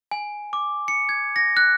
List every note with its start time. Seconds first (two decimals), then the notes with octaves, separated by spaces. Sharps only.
0.11 G#5
0.53 D6
0.88 C#7
1.09 G#6
1.36 A#6
1.57 F#6